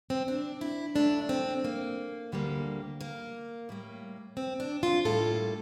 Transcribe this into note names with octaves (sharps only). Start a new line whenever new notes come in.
C4
D4
E4
A#2 A3 D4
C4
A#3
D2 D3 G3 A#3
A#3
A2 G3 A#3
C4
D4
F4
A2 G3 A#3 A4